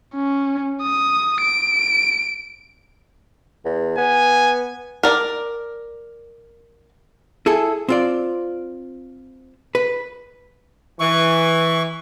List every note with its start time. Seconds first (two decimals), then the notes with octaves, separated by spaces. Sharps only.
0.15 C#4
0.82 D#6
1.42 D7
3.65 E2
3.98 B3 G#5
5.03 A#4 D5
7.46 E4 G#4 A4
7.89 C4 F4 D5
9.75 B4
10.99 E3 C#6